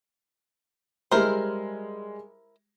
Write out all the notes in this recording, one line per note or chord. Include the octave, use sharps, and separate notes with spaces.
G3 G#3 E4 A#4 C5